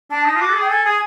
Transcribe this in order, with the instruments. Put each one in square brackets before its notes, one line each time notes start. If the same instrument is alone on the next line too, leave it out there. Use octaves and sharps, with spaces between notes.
[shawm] D4 [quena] A5
[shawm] D#4 [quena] A5
[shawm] F4
[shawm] F#4 [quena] D6
[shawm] A4
G#4
[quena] G5
[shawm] A4 [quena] G#5
[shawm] G#4 [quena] G#5